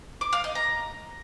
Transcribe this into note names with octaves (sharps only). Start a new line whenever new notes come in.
D6
F5
D#5
A#5